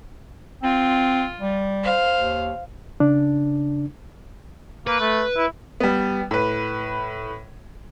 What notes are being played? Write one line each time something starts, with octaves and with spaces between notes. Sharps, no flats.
C4 F4
G3
C5 F5
D#2
C#3 D4
A#3 B4
A3
E4
G3 B3
A2 B4